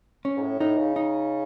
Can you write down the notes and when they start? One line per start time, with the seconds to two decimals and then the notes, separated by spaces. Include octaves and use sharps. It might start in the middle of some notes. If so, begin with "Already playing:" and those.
0.25 C#4
0.37 G#2
0.42 A2
0.60 A2 D#4
0.78 C#3
0.96 D#4